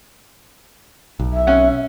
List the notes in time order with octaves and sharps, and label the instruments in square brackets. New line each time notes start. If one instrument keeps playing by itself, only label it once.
[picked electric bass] B1
[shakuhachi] E5
[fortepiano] C#4 F#5